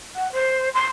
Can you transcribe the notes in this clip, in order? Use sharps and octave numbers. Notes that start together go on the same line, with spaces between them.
F#5
C5
C6